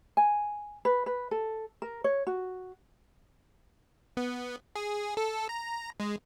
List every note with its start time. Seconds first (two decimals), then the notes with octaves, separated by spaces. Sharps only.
0.17 G#5
0.85 B4
1.06 B4
1.31 A4
1.82 A#4
2.04 C#5
2.27 F#4
4.17 B3
4.76 G#4
5.17 A4
5.49 A#5
6.00 G#3